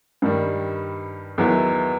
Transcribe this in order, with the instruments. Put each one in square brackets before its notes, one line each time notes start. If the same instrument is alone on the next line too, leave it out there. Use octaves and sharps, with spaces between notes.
[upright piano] G2 D#3 G3
E2 D#3 F#3 B3 E4